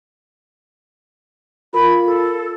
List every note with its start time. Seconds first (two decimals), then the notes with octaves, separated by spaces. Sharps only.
1.74 F4 A#4 B5
2.05 A4